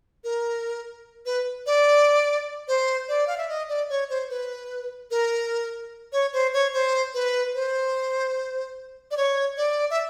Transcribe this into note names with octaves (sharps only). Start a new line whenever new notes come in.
A#4
B4
D5
C5
D5
F5
E5
D#5
D5
C#5
C5
B4
A#4
C#5
C5
C#5
C5
B4
C5
D5
C#5
D5
E5